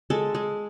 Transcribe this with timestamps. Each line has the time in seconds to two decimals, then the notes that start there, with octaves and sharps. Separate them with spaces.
0.10 G#3 A4
0.35 G#3